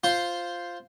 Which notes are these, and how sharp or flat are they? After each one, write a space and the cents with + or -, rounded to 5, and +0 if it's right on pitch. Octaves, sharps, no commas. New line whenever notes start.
F4 +0 C5 +0